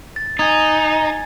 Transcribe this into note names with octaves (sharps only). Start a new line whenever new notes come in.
A6
D#4 G#5 G#6 A6